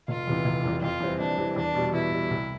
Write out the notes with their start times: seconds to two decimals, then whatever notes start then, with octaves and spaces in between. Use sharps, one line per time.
0.08 F1 F4
0.27 E2 C3 E3
0.45 F1
0.64 E2 C3 E3
0.82 F2 F4
1.00 E3 G3 C4
1.20 F2 D4
1.38 E3 G3 C4
1.56 E2 D4
1.75 B2 G3
1.93 E2 E4
2.12 B2 G3
2.31 C2